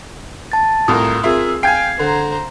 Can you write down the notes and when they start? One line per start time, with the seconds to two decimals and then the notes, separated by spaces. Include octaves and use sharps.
0.52 A5 A6
0.88 C2 A2 F4 A#4 D#6
1.23 C4 F4 G#4 A#4 E5 E6
1.63 F5 G5 G#5 G#6 C7
1.99 D3 C5 A#5